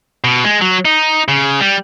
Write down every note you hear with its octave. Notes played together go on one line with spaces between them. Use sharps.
B2
G#3
F#3
D#4
C#3
G3